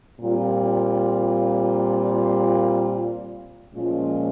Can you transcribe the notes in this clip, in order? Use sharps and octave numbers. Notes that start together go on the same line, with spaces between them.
A#2 G3 C4 F4
A#2 F3 G#3 C#4 F4